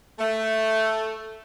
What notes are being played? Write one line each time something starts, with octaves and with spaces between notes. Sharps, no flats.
A3